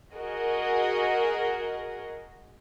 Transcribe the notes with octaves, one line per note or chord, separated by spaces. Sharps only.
F#4 G#4 A#4 D#5